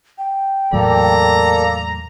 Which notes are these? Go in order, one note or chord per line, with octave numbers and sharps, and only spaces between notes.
G5
E2 A2 F#3 A#3 A4 D5 A#5